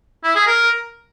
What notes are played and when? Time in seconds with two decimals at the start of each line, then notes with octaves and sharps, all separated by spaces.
0.24 E4
0.35 G#4
0.47 A#4